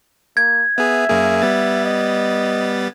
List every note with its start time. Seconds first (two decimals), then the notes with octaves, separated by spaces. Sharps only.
0.37 A#3 G#6
0.78 B3 G#4 E5
1.08 F#2 A#3 G#4
1.42 G3 B3 A6
1.85 D#5